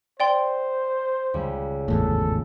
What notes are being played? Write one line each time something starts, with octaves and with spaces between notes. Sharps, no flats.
C5 D5 G5 C6
C#2 G3
G#1 E2 A2 A4